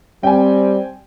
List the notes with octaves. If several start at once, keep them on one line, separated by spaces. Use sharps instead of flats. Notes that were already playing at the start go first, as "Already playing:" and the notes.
G3 C4 G5 G#5